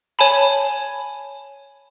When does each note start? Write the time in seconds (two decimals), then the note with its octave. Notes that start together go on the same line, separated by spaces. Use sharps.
0.19 C#5 G#5 A5 B5